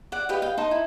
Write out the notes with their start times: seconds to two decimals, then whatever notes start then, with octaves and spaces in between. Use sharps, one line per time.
0.12 D5 F#5
0.29 G4 B4 D#5 F5
0.42 F5 G5
0.58 D#4 D#5 A5 C6
0.71 E4